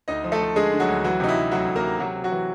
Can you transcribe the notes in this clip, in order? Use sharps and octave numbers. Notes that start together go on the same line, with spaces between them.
D2 D#4 D#5
F3
A3 A4
F3
D3 G#3 G#4
D3
F#3 F#4
D2
E3 F#3 F#4
C3 D#4
E4
C3
D2 F#3 F#4
D2
A#3 A#4
C3
C3 F#3 F#4
C3
F#3 F#4
E3